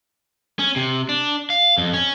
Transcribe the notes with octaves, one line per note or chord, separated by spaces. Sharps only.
C#4
C3
D4
F5
F2
C#4